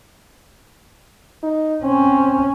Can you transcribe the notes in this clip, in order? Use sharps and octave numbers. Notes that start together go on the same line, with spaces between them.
D#4
C4 C#4